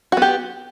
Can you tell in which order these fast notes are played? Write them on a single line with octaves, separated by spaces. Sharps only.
F#4 B3 G4